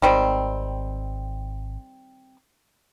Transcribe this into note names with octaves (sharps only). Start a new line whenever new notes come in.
G#1 D#3 G3 C4